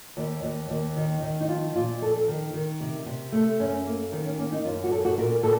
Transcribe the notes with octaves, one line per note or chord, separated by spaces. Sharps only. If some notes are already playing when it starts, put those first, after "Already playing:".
D#2
D#2
D#2
D#3
D#3
D#4
F3 F4
A#2 F4
F2 A4
D#3
D#3
C3
C3
A3
F#2 C#4
A#3
D#3 C4
C#4
A#3 C#4
D#4
F#2 F4
F#4
F#2 A4
F#4
A#2 A#4
A#2 A4